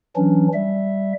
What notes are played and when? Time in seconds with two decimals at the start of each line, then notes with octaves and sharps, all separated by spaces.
0.16 E3 F#3 C#4 D4
0.54 G3 E5